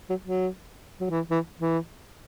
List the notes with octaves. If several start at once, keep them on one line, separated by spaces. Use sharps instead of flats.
F#3
F#3
F#3
E3
E3
E3